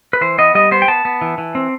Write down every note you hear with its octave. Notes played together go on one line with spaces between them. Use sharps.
B4
E3 C5
B3 D#5
G3 D#5
B3 C5
G5
B3 A5
B3
E3
E3
C4